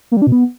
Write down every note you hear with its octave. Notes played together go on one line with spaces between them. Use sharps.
A#3
G3
D4
B2
B3